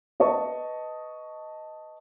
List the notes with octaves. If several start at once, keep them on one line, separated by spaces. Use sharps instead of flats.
B4 D#5 A5 C#6